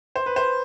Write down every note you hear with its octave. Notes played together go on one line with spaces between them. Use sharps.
C5
B4
C5